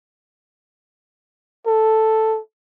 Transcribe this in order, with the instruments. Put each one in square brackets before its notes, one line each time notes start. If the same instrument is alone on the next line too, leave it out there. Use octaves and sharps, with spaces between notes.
[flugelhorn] A4